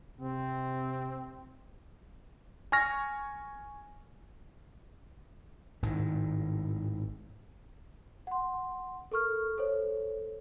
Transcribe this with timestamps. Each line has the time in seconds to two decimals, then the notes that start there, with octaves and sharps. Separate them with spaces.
0.21 C3 C4
2.72 G#5 C#6 F6 A#6
5.82 G#1 A2 D#3
8.27 F#5 C6
9.12 A4 A#4 C#6 F6
9.58 A4 C5 C#5